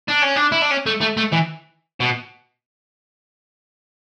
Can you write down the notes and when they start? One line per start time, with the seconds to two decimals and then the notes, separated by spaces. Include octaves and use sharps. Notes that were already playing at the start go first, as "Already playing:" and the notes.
0.09 D4
0.23 C#4
0.36 D4
0.52 E4
0.62 D4
0.71 C#4
0.86 A3
1.01 A3
1.17 A3
1.32 E3
2.00 B2